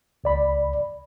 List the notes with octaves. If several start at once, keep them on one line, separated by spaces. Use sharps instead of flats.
C#2 D5 B5